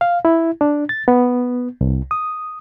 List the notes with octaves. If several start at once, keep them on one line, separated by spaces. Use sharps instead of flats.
F5
E4
D4
A6
B3
C2
D#6